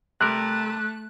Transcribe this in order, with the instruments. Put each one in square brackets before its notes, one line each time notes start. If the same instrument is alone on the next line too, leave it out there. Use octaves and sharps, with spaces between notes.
[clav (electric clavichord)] C3 G3 A#4 [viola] A3 [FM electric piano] F#6